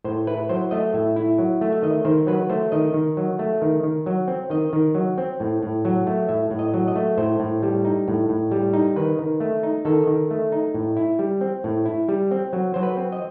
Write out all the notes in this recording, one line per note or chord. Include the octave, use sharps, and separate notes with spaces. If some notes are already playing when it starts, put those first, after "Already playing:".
A2 C5
E4 B4
F#3 C5
A3 D#5
A2 E5
E4
F#3
A3
E5
D#3 D#5
D#3 C5
F#3 B4
A3 C5
D#3 D#5
D#3
F#3
A3
D#3
D#3
F#3
C4
D#3 D#5
D#3
F#3
C4
A2
A2
F#3
A3
A2 E5
A2
D#5
F#3
D#5
A3
A2 C5
A2
G3
D#4
A2
A2
G3
D#4
D#3 B4
D#3
A3
D#4
D#3 A4
D#3
A3
D#4
A2
E4
G3
C4
A2
E4
G3
C4
F#3
F#3 C5
B4
C4
D#5